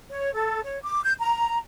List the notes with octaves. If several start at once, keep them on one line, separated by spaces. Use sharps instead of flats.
C#5
A4
C#5
D6
G6
A#5